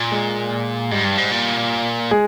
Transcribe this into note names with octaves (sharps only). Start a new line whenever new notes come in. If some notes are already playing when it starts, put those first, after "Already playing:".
Already playing: A#2
G#3 G#4
G#2 G3 G4
G2
G#2
A#2
G#3 G#4